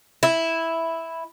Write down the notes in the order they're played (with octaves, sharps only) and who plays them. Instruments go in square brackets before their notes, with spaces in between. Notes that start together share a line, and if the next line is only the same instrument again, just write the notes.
[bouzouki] E4